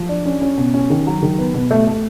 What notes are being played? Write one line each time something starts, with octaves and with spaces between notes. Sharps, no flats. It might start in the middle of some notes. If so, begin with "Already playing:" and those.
Already playing: F3
D4
C#4
C#4
B2
C#4
D#3
F#3
D#3
B3
B2
A3
A3